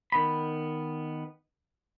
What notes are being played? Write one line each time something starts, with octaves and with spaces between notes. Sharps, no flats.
D#3 B3 B5